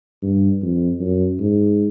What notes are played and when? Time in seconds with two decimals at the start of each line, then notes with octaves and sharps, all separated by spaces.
0.22 G2
0.62 F2
1.00 F#2
1.39 G#2